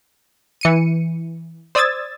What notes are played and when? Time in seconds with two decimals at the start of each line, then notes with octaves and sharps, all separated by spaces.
0.61 E3 C#7 D#7
1.75 C5 D5 D#6 E6 G#6 A6